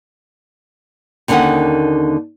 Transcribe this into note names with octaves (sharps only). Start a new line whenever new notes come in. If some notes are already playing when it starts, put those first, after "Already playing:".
D#2 D3 A#3 C#4 D#4 F#5